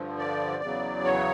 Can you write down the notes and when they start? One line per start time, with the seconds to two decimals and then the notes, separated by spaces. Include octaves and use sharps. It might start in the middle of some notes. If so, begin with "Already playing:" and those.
Already playing: G2 D3 F3
0.18 D5
0.61 E2 C#3 F#3
1.04 C#5